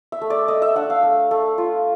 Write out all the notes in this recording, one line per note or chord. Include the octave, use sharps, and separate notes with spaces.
E5
A3
D5
A3 D#5
E5
D4 F#5
F5
A3
A3
F4